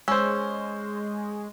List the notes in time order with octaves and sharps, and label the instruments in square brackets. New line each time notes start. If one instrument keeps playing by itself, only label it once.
[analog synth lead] G#3 [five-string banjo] C#4 [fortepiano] C5 E6